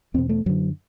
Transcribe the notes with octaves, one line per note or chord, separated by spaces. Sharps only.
E2 B2 C4
A3
F#2 D3 F#3